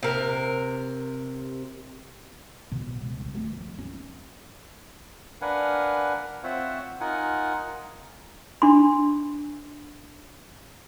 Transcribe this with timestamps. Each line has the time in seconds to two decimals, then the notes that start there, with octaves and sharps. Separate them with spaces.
0.03 C3 A#4
2.72 A1 B2
3.01 C#2
3.21 C2
3.35 D#3 A3
3.53 F3
3.79 C#4 D#4
5.42 D4 A#4 B4 F5 F#5 G#5
6.44 C4 F4 C5 C#5 E5 F#5
7.00 D#4 F4 A#4 F#5 G#5
8.62 D4 C6